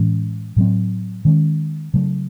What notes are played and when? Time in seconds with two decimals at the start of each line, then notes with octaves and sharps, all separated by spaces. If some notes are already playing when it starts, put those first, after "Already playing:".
Already playing: A2 E3 G#3 C#4
0.56 A2 F#3 C4
1.25 D#3 G#3 C#4
1.94 C#3 F#3 A3